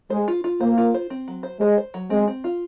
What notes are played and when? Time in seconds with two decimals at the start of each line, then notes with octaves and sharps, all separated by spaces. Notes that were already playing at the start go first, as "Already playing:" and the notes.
0.10 G#3 C5
0.28 F4
0.44 F4
0.61 A#3 C5
0.78 F4
0.94 C5
1.10 C4
1.28 F#3
1.43 C5
1.60 G#3 C5
1.78 C5
1.94 F#3
2.10 G#3 C4
2.28 C4
2.44 F4